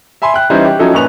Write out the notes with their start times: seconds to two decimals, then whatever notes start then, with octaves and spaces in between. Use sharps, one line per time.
0.22 E5 G#5 B5 C6
0.34 G5 F#6
0.50 E3 G3 C#4 D#4 E4 C5
0.65 G4
0.79 F3 F#3 C#4 D#4 E4 A4
0.93 F#2 A#2 B4 C#6 F#6 F7